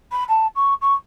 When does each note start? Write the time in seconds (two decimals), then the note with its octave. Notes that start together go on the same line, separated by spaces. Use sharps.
0.12 B5
0.28 A5
0.55 C#6
0.81 C#6